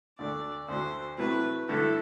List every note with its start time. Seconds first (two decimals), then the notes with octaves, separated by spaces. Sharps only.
0.18 D2 D3 A3 D4 A4 D5
0.68 D2 D3 A3 D4 F#4 C5
1.18 C3 F#3 A3 E4 B4
1.68 G2 D3 A3 E4 A4